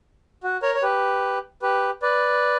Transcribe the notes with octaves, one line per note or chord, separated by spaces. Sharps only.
F#4
A#4 C#5
C#5
G4 B4
G4 B4
B4 D5